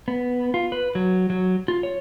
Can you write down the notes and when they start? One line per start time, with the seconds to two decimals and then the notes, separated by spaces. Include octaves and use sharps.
0.08 B3
0.54 F4
0.72 B4
0.95 F#3
1.30 F#3
1.68 F4
1.83 C#5